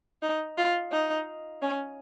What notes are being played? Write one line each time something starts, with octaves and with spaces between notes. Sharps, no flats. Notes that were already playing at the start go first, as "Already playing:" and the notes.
D#4
F4
D#4
C#4